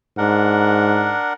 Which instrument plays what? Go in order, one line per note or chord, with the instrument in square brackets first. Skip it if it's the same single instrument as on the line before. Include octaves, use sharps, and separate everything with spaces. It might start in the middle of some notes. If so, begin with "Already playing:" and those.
[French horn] G#2 [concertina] D4 A#4 F#5